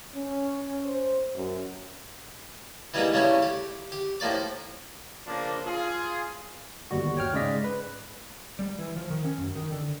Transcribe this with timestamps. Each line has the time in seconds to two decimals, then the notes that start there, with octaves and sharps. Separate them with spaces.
0.15 C#4
0.85 C5
1.35 F#2
2.94 E3 G3 G#3 A#3 B3 D#4
3.13 E2 C#3 G3 A3 C#4 E4
3.42 G4
3.92 G4
4.20 A2 F3 A#3 D5 D6
5.27 C#3 F3 A#3 D4
5.66 F4 G#4
6.91 G1 D#2 G3 F#4
7.17 C#5 G5 F6
7.33 G#2 C#3 G#3 D5 D#5 B6
7.64 B4
8.59 G3
8.78 E3
8.96 F3
9.10 D#3
9.24 C#4
9.38 F#2
9.55 D#3
9.72 D3